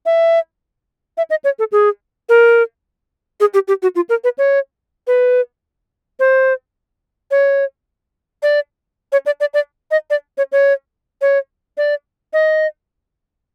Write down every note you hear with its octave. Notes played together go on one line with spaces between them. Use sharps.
E5
E5
D#5
C#5
A4
G#4
A#4
G#4
G4
G4
F#4
F4
A#4
B4
C#5
B4
C5
C#5
D5
C#5
D5
D5
D5
D#5
D5
C#5
C#5
C#5
D5
D#5